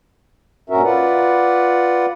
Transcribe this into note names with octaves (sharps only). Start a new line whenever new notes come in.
G2 A#2 C#4 F#4 A#4 E5
F4 B4 D5 F#5